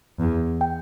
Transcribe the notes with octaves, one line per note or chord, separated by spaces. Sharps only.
E2
G5